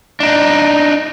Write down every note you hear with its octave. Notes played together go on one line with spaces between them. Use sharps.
D4 D#4